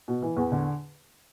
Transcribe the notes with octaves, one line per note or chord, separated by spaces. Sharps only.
B2
E3
E2
D3